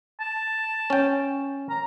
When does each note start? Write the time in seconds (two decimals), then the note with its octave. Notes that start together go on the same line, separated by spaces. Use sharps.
0.20 A5
0.90 C#4 G5
1.70 A#5